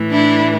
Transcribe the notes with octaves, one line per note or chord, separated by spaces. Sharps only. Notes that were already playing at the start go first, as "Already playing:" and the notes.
Already playing: A2 E3
D4 E4